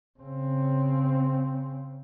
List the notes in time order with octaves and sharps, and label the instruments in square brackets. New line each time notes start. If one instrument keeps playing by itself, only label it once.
[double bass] C#3 C4